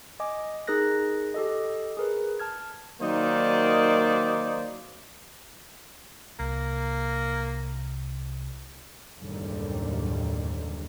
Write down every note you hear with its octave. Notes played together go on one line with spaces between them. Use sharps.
D#5 G#5 D6
D#4 G#4 A#4 F#6 A#6
G4 A4 D#5
G#4 A#4 B4
A5 F6 G#6
D#3 F#3 A#3 D#4 C5 D5
C2 A#3
F#1 D#2 A2 D3 G3